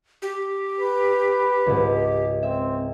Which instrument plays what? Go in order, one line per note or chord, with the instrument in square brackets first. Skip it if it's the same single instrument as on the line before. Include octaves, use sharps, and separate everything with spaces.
[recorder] G4
[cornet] B4
[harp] C#2 G#2
[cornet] C4 [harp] E5